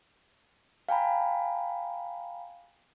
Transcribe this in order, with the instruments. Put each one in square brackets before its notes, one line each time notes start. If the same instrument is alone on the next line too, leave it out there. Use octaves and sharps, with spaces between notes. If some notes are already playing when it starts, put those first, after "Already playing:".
[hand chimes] F5 G5 G#5 A#5 B5